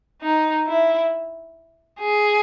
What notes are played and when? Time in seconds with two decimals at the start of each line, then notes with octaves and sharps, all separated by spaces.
0.22 D#4
0.66 E4
1.99 G#4